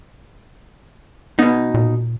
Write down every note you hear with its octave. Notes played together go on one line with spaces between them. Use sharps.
B2 B3 D#4
A#2